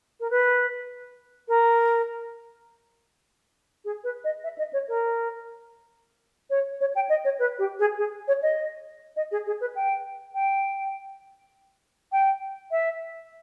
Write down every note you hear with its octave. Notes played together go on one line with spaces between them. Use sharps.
A#4
B4
A#4
G#4
B4
D#5
E5
D#5
C#5
A#4
C#5
C#5
G5
D#5
C#5
B4
G4
G#4
G#4
C#5
D#5
D#5
G#4
G#4
B4
G5
G5
G5
E5